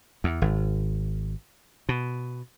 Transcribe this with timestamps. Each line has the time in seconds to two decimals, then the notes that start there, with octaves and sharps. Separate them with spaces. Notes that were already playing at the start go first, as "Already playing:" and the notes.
0.24 E2
0.42 G#1
1.89 B2